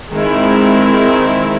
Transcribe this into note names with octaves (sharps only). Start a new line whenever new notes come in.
D#3 G#3 C4 E4